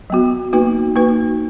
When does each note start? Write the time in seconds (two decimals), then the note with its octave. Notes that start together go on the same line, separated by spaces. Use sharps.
0.10 F#3 B3 F#4
0.53 A#3 D#4 F#4 B4
0.95 A#3 D#4 F#4 B4